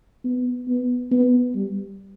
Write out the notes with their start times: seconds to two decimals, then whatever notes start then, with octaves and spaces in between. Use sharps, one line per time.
0.24 B3
0.68 B3
1.11 B3
1.55 G3